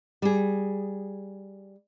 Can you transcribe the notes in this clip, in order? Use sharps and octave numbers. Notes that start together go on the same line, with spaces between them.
G3 G#4